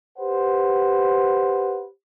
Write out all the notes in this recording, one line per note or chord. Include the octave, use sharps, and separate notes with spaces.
G4 B4 C5 F#5